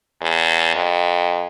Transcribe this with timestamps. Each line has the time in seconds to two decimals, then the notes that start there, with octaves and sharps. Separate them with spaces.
0.21 E2
0.75 F2